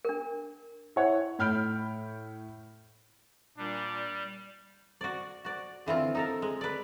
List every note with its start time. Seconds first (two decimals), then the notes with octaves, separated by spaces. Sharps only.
0.05 D4 A#4
0.96 E4 C#5 F#5
1.39 A2 B5 F6 G6 D7
3.58 A#2 G3 D4
5.01 F#4 D5
5.45 F#4 D5
5.86 D3 E3 C4 F4
6.15 D#4 A4 A#4
6.42 G#3
6.61 B4 D5